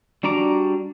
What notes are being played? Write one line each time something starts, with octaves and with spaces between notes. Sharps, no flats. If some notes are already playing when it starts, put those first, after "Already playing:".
G3 D4 F#4 A#5 D6